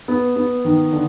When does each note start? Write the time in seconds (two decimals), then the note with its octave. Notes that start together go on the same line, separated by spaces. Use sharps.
0.08 B3
0.36 B3
0.65 D#3
0.93 D3